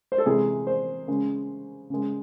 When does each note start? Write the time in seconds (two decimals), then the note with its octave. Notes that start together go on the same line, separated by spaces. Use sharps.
0.12 C5
0.18 A4
0.26 C3 E3 G#3 G#4
0.67 C5
1.08 C#3 G#3
1.90 C#3 G#3